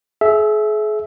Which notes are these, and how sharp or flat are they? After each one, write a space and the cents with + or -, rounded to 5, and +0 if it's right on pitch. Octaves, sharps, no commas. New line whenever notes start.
G#4 +40 E5 +0